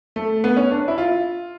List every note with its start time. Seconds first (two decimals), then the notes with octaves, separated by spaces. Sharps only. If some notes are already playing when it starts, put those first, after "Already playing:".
0.16 A3
0.44 B3
0.57 C#4
0.71 D4
0.88 E4
0.98 F4